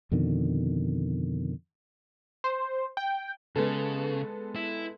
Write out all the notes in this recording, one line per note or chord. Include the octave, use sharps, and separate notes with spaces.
F2 B2 D3 D#3
C5
G5
C#3 G#3 B3 A4
E4